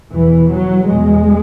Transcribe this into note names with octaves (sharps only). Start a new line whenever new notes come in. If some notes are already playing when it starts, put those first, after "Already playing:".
E2 B2 E3
F#3
E2 B2 G#3